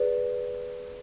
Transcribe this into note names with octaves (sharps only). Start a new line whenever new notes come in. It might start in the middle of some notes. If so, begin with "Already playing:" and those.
Already playing: G#4 B4 D5